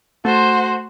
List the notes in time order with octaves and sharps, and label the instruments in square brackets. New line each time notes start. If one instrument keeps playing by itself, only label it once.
[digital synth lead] A3 [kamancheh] F#4 C5